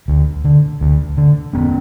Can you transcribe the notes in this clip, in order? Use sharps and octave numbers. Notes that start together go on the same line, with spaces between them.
D2
D3
D2
D3
E2 B3 C#4